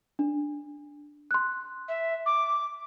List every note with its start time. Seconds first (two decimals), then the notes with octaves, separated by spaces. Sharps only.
0.19 D4
1.31 C6 F#6
1.88 E5
2.25 D6